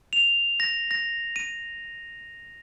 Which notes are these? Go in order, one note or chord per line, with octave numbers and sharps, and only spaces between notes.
F7
A#6
A#6
D#7